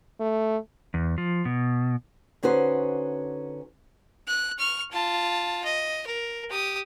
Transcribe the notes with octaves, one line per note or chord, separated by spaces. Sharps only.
A3
E2
F3
B2
D3 C#4 D#4 F#4 B4 C5
F#6
C#6 F6
F4 A5
D#5
A#4
G4 D#6